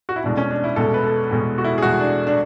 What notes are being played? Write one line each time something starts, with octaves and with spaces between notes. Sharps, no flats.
F#4
E4
E2 B2 G#3 D4
C#4
D4
E4
E2 B2 G#3 A4
B4
A4
E2 B2 G#3
F#4
E4
G#4
E2 B2 G#3 F#4
D4
D4